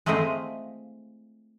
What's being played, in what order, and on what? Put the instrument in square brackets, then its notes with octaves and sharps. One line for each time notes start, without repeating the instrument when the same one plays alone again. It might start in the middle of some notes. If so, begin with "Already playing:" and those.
[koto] G#3 A3 C4 E4 D#5 F5